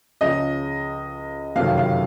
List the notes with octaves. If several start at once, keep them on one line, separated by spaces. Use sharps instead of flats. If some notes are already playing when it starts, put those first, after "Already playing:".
C#2 C#3 F3 D#5
F#1 F2 C3 D#3 F#3 F5
F5